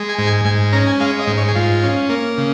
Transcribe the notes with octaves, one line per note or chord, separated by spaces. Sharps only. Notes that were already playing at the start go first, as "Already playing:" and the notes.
Already playing: G#3
G#5
G#2
G#5
G#2 G#5
C#4 A#5
G#5
G#3 F5
D#5
G#2
C#5
G#4
G#2 F4
C#4
A#3
C#3